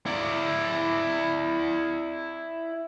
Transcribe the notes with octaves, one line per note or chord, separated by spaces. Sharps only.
E4 D5